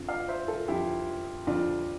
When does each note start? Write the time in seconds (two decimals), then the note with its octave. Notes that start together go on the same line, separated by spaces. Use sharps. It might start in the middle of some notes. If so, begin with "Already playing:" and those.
Already playing: F2 D3 F3
0.09 D5 F5
0.28 C5 E5
0.48 F4 A4
0.68 F2 D3 F3 E4 G4
1.47 F2 D3 F3 D4 F4